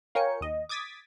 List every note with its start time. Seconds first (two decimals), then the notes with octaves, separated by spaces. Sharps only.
0.15 F4 A#4 C#5 G5 G#5 C#7
0.41 D#2 D#5
0.69 D6 D#6 G#6 A6 B6